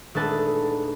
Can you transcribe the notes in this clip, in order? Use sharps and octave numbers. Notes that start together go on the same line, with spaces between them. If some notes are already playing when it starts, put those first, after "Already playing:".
D#1 G#3 A3 D4 B4 A5